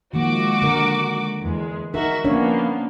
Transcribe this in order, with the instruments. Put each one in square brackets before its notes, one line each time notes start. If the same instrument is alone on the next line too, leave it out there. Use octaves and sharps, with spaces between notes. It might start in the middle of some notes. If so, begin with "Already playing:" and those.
[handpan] D#3 F3 A#3 [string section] G#3 F#4 D6
[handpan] D3 A#4
[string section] E2 G#3
[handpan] D#4 A#4 [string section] F#4 E5
[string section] F3 A#3 B3 [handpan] C#4 D4 C#5